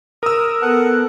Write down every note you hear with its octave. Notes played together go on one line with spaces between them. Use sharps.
A#4 D#6 E6
B3 A4 F#5